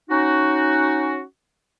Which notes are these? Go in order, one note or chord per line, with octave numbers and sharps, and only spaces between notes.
C#4 D#4 F#4